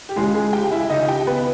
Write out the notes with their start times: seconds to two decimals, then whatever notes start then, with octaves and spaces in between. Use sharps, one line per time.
0.09 G4
0.16 C#2 C#3 E3 G#3 G#4
0.35 G#3 G#4
0.53 G4 G5
0.72 E4 E5
0.90 C#2 C#3 E3 D#4 D#5
1.08 G4 G5
1.27 B3 B4